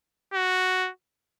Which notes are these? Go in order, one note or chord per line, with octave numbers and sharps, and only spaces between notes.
F#4